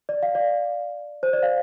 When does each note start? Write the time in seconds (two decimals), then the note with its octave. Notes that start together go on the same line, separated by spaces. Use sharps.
0.09 D5
0.23 F5
0.35 D5
1.23 C5
1.33 D5
1.43 F5